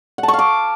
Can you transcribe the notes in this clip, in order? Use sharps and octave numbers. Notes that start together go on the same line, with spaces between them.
F#5
A5
C#6
F5
D6